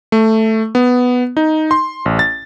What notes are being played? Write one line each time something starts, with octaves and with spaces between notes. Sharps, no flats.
A3
B3
D#4
C6
A1
A6